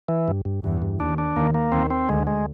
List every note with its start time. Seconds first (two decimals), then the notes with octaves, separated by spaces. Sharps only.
0.08 E3
0.28 G2
0.45 G2
0.64 E2 G2 E3
0.82 G2
1.00 D#2 D#3 D4
1.18 D4
1.36 D#2 D#3 A#3
1.54 A#3
1.72 D#2 D#3 C4
1.90 C4
2.08 D2 D3 G#3
2.27 G#3